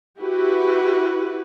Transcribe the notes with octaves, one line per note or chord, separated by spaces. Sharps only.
E4 F#4 G4 B4